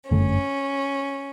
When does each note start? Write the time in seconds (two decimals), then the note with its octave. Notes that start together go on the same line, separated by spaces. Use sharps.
0.11 G1 F#2 D3 A3 C#4